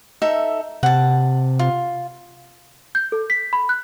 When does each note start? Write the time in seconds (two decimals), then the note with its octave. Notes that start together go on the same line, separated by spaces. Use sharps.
0.22 D#4 A4 E5
0.83 C3 F#5 A5
1.59 F4
2.95 G6
3.12 A4
3.30 B6
3.53 B5
3.69 F#6